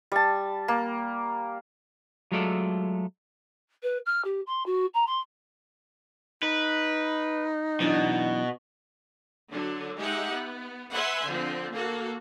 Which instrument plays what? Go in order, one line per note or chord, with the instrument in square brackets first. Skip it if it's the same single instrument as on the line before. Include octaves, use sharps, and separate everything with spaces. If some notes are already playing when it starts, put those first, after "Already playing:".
[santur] G3 A5
A#3
[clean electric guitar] F#3 G#3 A3 F4 A4 D5
[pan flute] B4
F6
G4
C6
F#4
A#5
C6
[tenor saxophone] D#4 [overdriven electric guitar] B4
[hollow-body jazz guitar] F#2 E3 D4 [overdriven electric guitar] B2
[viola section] D3 F#3 D4
G#3 D#4 G4 E5 F#5
B3
B4 E5 F#5 G#5 C6
D3 F3 C4
A#3 F#4 A4